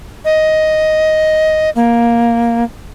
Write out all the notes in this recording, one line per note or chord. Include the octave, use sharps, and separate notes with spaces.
D#5
A#3